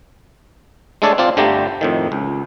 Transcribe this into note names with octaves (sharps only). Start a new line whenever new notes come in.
G#3 A3 D4 A4 C#5 D5
C4 F4 D5
G1 D3 G3 A3 G4 A#5
F2 A2 D#3
C#2